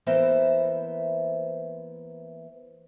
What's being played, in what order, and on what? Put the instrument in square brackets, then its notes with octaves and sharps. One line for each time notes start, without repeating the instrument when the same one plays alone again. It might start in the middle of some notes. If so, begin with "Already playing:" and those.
[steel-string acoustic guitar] E3 A#3 B3 C5 E5